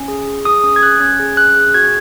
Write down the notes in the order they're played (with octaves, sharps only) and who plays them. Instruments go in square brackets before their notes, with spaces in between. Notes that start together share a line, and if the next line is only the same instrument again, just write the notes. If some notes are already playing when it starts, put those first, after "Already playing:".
Already playing: [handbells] C#4
G#4
G#4
G#4 D#6
C#4 D#6
G#6
C#4 F#6
C#4 G#6
G#4
C#4 F#6
G#4
F#4 G#6